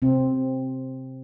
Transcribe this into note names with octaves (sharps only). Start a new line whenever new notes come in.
C3 C4